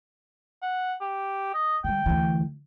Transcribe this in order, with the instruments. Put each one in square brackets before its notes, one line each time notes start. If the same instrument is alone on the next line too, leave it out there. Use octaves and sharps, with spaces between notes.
[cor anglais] F#5
G4
D#5
[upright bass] D3 G3 [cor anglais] G5
[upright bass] D2 E3